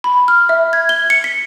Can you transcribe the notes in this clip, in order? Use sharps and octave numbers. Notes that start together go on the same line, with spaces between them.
B5
F6
E5
G#6
G7
C#7
B6